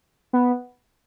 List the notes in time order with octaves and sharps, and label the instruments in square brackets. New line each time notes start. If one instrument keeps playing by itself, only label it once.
[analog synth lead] B3